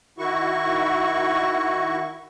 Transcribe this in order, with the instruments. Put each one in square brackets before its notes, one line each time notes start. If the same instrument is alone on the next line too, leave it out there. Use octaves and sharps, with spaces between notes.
[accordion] D#3 E4 F#4 C#6